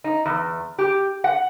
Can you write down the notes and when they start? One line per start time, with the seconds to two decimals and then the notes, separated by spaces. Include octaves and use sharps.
0.04 D#4
0.26 E2
0.79 G4
1.24 F#5